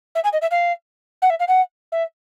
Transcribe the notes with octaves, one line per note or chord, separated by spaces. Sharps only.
E5
G#5
D#5
E5
F5
F#5
E5
F5
F#5
E5